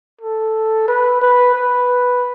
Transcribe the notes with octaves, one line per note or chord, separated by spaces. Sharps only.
A4
B4
B4
B4